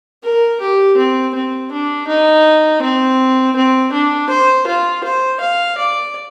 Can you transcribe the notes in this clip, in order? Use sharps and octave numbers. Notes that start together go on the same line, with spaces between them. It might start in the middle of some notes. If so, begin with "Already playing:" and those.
A#4
G4
C4
C4
D4
D#4
C4
C4
D4
C5
F4
C5
F5
D5